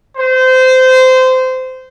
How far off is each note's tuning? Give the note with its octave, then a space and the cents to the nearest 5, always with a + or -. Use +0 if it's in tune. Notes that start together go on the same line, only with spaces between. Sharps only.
C5 -20